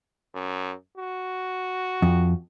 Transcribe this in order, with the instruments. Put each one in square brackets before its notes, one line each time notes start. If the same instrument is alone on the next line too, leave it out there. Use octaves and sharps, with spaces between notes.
[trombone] F#2
F#4
[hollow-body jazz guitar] F2